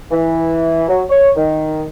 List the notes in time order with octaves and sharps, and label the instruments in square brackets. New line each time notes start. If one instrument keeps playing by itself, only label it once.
[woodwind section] E3
F#3
C#5
D#3